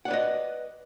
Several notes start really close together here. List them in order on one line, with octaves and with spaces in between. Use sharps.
F#5 D5 B4 D#5